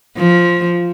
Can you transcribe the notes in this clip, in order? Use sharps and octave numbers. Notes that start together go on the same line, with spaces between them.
F3